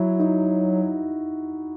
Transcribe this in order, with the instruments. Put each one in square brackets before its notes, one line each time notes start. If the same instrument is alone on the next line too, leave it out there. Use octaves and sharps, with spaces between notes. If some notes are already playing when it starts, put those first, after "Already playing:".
Already playing: [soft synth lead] F#3 [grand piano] E4 F#4
[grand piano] D#4